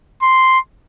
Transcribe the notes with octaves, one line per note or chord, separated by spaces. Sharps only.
C6